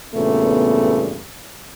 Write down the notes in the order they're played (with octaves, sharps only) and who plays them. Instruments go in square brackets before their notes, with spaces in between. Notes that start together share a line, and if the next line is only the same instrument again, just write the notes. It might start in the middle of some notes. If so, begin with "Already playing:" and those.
[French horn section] E2 G2 A#2 C#3 A3 B3